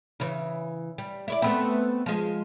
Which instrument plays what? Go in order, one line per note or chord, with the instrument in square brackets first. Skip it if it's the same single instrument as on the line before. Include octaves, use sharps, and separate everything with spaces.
[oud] C#3 E3
G3
E4 C#5 D5
A3 B3 C4
F3 G#3